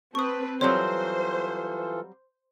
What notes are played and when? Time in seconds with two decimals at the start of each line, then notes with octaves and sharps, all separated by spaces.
0.15 C4 B4 A5 C#6 D#6
0.61 E3 F#3 G3 C4 F4 A4 C5 C#5